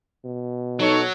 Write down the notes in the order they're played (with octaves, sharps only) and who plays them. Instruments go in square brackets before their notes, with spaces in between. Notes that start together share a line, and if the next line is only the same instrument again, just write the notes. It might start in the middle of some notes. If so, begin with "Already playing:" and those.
[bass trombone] B2
[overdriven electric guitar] F#3 [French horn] D#4 [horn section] A4 C#5